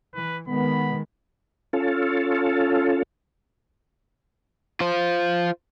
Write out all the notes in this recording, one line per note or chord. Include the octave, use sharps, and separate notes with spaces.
E3 B4
D#3 G#3 B3 B5
C#4 F4 A4
F4 C5